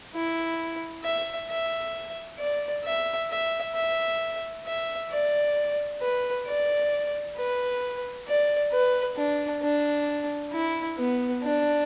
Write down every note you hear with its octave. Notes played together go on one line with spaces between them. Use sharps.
E4
E5
E5
D5
E5
E5
E5
E5
D5
B4
D5
B4
D5
B4
D4
D4
E4
B3
D4